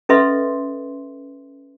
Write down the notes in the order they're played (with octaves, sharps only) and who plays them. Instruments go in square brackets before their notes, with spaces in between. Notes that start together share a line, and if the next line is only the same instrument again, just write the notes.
[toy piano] C#4 A4 B4 D#5 E5 C6